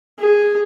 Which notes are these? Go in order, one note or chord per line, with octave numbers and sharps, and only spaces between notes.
G#4